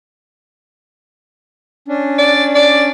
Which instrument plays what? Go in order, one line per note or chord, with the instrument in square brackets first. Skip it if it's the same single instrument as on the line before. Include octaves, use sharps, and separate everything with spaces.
[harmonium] C#4 D4
[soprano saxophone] D5
D5